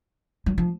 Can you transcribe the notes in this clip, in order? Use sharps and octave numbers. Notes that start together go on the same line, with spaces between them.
F#3
F3